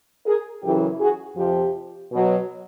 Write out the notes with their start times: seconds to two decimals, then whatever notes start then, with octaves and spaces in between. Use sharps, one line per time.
0.25 G#4 A#4
0.62 F#2 C#3 E3 G4 A4
1.00 F#4 G#4
1.36 F2 C3 F3 F4 G4
2.11 B2 F#3